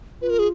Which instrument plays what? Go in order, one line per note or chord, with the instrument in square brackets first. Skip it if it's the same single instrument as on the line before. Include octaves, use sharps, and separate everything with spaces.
[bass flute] F4 [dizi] B4
[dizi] A#4
G#4